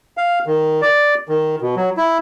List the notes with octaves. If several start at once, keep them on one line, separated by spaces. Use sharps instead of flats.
F5
D#3
D5
D#3
B2
F#3
E4